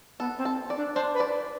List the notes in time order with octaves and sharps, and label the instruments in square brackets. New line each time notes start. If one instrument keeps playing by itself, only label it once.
[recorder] B3 [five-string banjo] A4
[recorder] C4
[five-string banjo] A4
D5
[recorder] D4
[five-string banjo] D4 [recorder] C5
[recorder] B4
[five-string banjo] D5